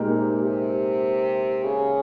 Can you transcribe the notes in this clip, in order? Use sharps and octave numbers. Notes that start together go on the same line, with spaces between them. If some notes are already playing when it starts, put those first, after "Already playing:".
Already playing: A#2 G#3 D#4 G4 A#4
C3
C3
C#3